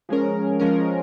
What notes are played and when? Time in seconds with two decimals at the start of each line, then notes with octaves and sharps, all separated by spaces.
0.09 F3 G#3 C#4 A#4
0.59 F3 G#3 C#4 A#4